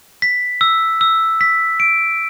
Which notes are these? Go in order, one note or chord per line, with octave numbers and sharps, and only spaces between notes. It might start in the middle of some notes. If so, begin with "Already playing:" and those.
B6
E6
E6
B6
D7